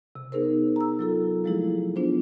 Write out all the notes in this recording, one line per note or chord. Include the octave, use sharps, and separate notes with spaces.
C3
B3 D#4 G#4 A#4 C5
A#5 E6
F#3 F4 A4
F3 F#3 G#3 A3 E4 G#4
B3 D4 F4 C5